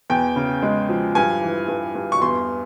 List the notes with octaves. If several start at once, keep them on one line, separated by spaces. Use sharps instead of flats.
E2 G5
C#3
G#3
F3
G2 G#5
E3
G2
G2
C#6
E2 C6